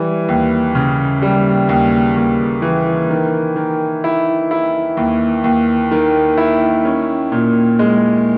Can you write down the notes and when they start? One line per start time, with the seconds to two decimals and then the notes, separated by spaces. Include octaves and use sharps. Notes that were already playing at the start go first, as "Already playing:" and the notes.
Already playing: E3 G3
0.28 D#2
0.75 C#3
1.22 G3
1.69 D#2
2.16 D#2
2.62 E3
3.10 D#3
3.56 D#3
4.04 E4
4.51 E4
4.97 D#2
5.44 D#2
5.91 D#3
6.38 E4
6.85 C#4
7.32 A#2
7.79 G#3